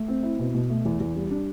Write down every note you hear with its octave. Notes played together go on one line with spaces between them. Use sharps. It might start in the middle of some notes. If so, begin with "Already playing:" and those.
Already playing: A3
C4
E4
B2
B2
A3
E2
E2
G3
D4